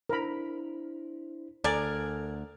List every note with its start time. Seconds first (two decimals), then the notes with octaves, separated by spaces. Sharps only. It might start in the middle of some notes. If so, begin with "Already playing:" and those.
0.09 D4 E4 A#4 C5 B5
1.64 D2 A4 A#4 D5 G#5 F6